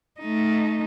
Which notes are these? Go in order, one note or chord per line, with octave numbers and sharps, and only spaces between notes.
A3 D#4